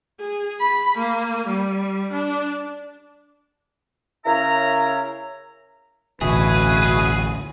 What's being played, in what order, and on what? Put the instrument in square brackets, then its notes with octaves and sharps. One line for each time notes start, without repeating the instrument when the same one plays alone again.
[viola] G#4
B5
A#3
G3
D4
[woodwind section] C#3 E4 A#4 C#5 E5 A#5
[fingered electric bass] A1 D2 [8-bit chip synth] B2 F#4 E5 [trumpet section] C#4 B4 [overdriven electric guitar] G#4